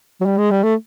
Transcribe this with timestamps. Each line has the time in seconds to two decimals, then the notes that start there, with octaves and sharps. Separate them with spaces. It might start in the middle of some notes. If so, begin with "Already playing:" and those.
0.21 F#3
0.26 G3
0.38 G#3
0.51 G3
0.64 A3